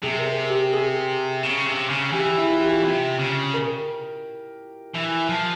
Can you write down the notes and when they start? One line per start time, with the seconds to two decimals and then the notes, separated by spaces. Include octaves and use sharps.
0.03 C3 G#4
0.19 A#4
0.26 G#4
0.50 G4
0.73 G#4
1.43 C#3
1.66 C3
1.90 C#3
2.13 E3 G4
2.37 E4
2.50 F4
2.60 G4
2.83 C3
3.19 C#3
3.54 A#4
4.95 E3
5.29 F3